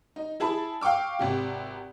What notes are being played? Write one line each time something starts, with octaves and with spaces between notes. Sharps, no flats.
D#4
E4 G#4 A5 B5
F5 G5 C#6 D6 E6
G#1 C3 G4